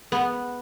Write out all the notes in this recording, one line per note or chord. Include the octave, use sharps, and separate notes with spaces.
B3